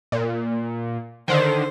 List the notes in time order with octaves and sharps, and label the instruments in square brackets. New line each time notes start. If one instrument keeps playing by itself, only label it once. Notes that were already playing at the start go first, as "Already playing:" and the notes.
[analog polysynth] A#2
[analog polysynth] D3 D#3 [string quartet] C5